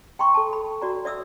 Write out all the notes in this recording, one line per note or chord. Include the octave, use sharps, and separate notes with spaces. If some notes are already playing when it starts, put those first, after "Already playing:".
G5 A#5 C6 C#6
A4 A5
B5
F#4 D5 A#5
D5 E5 D#6 E6